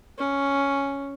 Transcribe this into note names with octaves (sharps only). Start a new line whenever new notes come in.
C#4